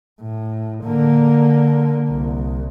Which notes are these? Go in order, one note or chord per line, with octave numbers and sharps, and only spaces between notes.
A2
D3 A#3
C2